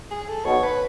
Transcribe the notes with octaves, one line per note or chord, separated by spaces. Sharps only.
G#4
A4
B1 B2 C#5
B4